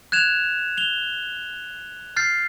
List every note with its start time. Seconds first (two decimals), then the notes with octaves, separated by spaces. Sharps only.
0.12 F#6 G#6 E7 F7
0.77 F7 G7
2.16 F6 G6 A6 C7